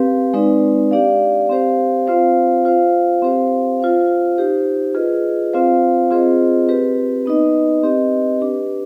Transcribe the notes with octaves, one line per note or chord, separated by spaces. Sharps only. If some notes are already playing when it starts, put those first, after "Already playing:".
Already playing: C4 G4 B4 F5
G#3 C4 D#4 B4 D5
D4 G4 D5 F5
C4 G4 C5 F5
C4 F4 C5 F5
F4 C5 F5
C4 G4 C5 F5
F4 C5 F5
D#4 G4 C5
F4 G#4 B4 D#5
C4 F4 C5 F5
C4 F4 G#4 C5 D#5
C4 G4 B4
B3 D#4 B4 D#5
C4 G4 B4 D#5
D4 G4 B4